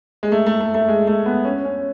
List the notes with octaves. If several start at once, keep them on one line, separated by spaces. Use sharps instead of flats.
G#3
A3
A3
A3
A3
G#3
A3
B3
C#4
C#4